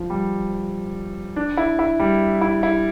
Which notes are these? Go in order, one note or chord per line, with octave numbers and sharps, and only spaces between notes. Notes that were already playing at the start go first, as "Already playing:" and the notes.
Already playing: F3
G3
D4
E4
E4
G3
E4
E4